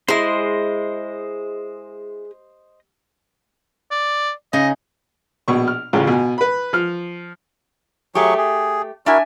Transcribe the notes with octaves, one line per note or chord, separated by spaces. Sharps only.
G#3 E4 C5 D#5 C6
D5
C#3 D#4 D#5
A#1 B2 C#6
F6
A1 D2 C#3 F4
B2 G#5
B4 B5
F3 F6
F#3 A3 G4 G#4 C#6
G#4
D4 E4 F#4 A#4 E5 G#5